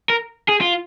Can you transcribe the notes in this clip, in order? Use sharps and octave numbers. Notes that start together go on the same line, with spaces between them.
A#4
G#4
F4